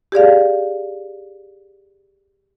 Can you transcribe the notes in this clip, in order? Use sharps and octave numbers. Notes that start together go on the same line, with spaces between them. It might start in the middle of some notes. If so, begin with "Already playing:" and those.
G4 G#4 D5 F5